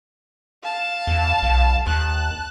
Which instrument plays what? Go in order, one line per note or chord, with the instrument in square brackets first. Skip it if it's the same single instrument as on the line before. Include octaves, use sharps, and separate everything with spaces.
[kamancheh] F5 A5
[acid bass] E2
B1
[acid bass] D#2 [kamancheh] A5 F#6